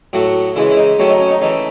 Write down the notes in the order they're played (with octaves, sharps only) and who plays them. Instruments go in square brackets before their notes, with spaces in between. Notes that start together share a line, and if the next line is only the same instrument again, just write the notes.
[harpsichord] A2 F#3 A3 F#4
C#3 E3 G#3 E4
E4
D#4
D#3 F#3 A3 C#4
D#4
C#4
D#4
C#3 E3 A3 D#4